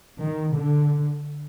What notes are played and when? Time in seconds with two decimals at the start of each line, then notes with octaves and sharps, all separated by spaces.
0.23 D#3
0.56 D3